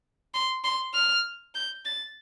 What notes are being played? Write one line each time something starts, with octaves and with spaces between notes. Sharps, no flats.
C6
C6
F6
G6
A6